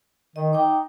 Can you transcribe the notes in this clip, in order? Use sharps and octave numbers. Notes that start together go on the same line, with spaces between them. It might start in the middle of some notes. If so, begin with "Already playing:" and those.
D#3 D#5
D#4 G5 D6